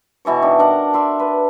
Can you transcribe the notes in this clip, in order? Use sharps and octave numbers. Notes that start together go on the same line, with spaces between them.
B2 E3 C#5 C#6
D#3 D4
D4 A#4 F#5 A5
D5 E5 C6
B4